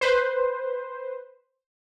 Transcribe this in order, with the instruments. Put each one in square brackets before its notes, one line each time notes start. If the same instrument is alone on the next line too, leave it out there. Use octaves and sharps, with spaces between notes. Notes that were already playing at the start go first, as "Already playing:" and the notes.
[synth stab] B4 C5